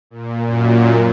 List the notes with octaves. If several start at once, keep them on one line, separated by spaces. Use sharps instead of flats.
A#2
F#2 A#2